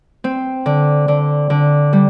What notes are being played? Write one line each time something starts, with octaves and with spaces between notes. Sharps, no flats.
C4
D3
D3
D3
G3